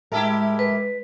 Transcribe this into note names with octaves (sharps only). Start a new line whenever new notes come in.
A2 G#3 E4 G4 A#4 E5 A5
B4